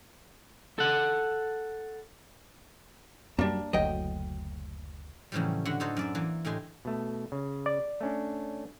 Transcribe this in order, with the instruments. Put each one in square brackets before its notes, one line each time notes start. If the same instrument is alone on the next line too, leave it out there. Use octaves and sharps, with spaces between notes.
[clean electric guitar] A4 F#5
[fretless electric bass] F#2 G3 [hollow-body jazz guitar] A#3 D4
[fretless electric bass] F#1 D2 F#3 [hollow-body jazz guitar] D#5 G5
[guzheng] F#2 A2 C#3 E3 F3 G3
D3 F#4 F#5
D#4 F#4 A4 C5 C#5 D#5
F#2 D5 E5
E3 A#3
A2 D3 G4 D#5 G#5 C6
[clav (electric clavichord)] B2 A3
C#3
[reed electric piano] D5
[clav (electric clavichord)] A3 C#4 D4